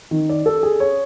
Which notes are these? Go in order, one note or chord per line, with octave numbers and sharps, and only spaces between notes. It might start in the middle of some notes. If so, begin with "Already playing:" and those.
D#3
D5
A4
G#4
C#5